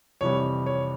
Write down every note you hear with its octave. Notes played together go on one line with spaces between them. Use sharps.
F2 C3 E3 G3 C#5
C#5